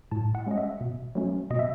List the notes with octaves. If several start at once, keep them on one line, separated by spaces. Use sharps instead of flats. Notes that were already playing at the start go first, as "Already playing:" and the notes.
A2 A5
F#5
G#3 C#4 D#5
E5
B2
F#3 A3 C#4
B2 D#5
E5